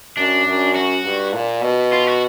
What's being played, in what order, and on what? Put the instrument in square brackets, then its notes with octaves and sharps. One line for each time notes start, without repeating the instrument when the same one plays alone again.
[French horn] F#2 [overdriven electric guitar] D4
[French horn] F#2
[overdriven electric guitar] F#4
[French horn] G2
A#2
B2
[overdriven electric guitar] F4
F#4